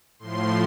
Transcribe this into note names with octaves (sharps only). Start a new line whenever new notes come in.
A2 F3 C6